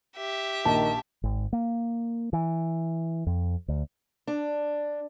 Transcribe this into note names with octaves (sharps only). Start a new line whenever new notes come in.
G4 E5
A#1 D#3 A5
G#1
A#3
E3
F2
D2
D4